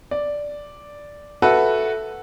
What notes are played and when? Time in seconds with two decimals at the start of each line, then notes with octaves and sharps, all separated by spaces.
0.11 D5
1.42 F#4 A4 B4 E5